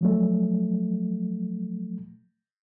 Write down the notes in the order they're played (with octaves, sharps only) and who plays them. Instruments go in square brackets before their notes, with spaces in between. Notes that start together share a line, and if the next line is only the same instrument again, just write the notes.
[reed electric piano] F3 F#3 A3